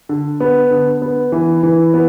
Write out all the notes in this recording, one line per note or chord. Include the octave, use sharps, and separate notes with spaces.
D3
B3
D3
B3
E3
E3
B3